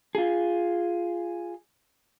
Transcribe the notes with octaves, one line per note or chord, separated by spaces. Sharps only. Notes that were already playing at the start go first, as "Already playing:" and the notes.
F4 G#4